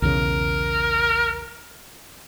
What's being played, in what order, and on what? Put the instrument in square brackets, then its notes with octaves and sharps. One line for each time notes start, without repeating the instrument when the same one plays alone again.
[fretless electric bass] B1 E2 C#3 [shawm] A#4